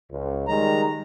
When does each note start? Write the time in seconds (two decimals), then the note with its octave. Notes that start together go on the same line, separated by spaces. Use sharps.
0.11 C#2
0.48 D#3 G3 G#3 A#5